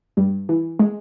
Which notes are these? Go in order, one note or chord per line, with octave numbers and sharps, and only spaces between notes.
G2
E3
G#3